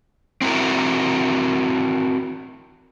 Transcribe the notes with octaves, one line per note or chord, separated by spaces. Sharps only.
C4 E4 F#4 A#4